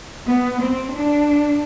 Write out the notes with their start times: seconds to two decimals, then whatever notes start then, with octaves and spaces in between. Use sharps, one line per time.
0.27 B3
0.61 C4
0.94 D4